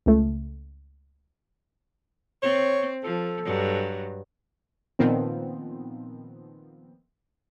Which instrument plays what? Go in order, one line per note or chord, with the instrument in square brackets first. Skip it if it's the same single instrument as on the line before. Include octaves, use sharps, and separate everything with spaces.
[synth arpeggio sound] C#2 A3
[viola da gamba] C4 [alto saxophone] C#5
[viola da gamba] F3 [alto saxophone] A4
[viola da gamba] G2 F#3
[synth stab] A#2 D#3 F3 B3 C4